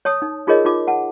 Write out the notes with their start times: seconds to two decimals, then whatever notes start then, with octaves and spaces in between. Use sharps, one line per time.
0.05 C#5 A5 D#6
0.22 D#4
0.47 D#4 F4 G#4 A#4 C#5 D#5
0.65 D#4 F4 D6
0.87 F#5 A5